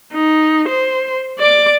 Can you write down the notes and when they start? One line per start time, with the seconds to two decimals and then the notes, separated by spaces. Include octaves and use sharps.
0.14 D#4
0.68 C5
1.39 D5 D6